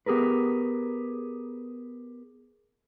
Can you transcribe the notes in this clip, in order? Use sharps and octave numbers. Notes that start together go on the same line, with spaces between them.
B3 G4 G#4 A#4 B4